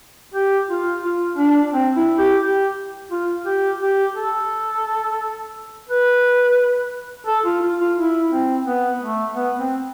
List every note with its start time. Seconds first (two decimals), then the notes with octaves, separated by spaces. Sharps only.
0.34 G4
0.69 F4
1.04 F4
1.37 D4
1.73 C4
1.96 E4
2.18 G4
2.42 G4
3.11 F4
3.46 G4
3.81 G4
4.16 A4
5.89 B4
7.27 A4
7.45 F4
7.62 F4
7.79 F4
7.97 E4
8.31 C4
8.66 B3
9.01 A3
9.35 B3
9.58 C4